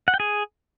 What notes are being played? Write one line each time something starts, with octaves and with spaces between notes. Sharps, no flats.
F#5
G5
G#4